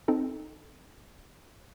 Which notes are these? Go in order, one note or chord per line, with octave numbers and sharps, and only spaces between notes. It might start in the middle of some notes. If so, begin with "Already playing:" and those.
C4 D#4 A4